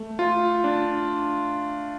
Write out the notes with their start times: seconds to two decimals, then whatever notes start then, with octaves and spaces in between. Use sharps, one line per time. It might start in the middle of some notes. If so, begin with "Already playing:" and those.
Already playing: A3
0.19 F4
0.64 D4